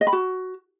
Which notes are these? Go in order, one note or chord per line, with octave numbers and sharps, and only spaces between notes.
D#5
B5
F#4